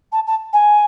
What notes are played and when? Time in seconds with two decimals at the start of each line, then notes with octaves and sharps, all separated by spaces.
0.12 A5
0.27 A5
0.53 G#5